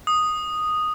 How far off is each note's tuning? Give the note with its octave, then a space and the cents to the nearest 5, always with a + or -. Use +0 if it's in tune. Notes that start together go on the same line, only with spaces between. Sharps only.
D#6 -5